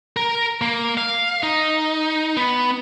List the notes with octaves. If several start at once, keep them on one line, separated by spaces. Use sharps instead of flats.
A#4
A#3
F5
D#4
B3